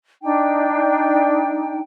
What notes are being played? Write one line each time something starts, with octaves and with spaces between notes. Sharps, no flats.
D4 D#4 G5